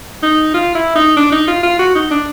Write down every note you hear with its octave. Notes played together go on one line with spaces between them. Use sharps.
D#4
F4
E4
D#4
D4
D#4
F4
F4
F#4
D#4
D4